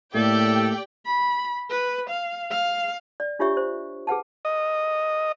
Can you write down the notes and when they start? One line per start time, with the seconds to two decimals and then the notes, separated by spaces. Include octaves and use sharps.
0.15 A2 A3 A#3 G4 A4 D5 G5
1.06 B5
1.70 B4
2.10 F5
2.51 F5
3.20 D5
3.39 D4 F4 G4 C#5 E5 C#6
3.57 C5
4.07 G#4 B4 F#5 A5
4.45 D#5